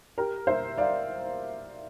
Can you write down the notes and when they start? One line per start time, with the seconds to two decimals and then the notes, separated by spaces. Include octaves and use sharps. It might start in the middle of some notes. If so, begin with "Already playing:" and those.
0.18 G4 A#4
0.47 C5 E5
0.78 D5 F5